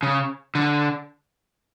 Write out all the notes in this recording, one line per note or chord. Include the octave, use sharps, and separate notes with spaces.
C#3
D3